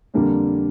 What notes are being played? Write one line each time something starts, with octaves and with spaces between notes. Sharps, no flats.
F2 D3 G3 A#3 D4